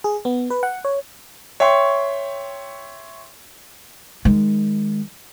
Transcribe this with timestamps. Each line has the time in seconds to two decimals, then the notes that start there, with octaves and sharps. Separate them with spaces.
0.04 G#4
0.25 B3
0.50 B4
0.63 F#5
0.85 C#5
1.60 C#5 E5 G5 C6 C#6
4.25 D#3 G#3